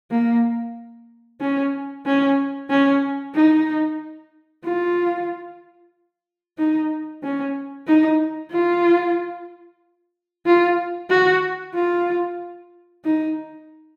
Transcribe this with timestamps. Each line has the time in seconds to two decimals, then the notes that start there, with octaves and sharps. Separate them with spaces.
0.11 A#3
1.41 C#4
2.06 C#4
2.70 C#4
3.35 D#4
4.64 F4
6.58 D#4
7.23 C#4
7.87 D#4
8.51 F4
10.46 F4
11.10 F#4
11.75 F4
13.04 D#4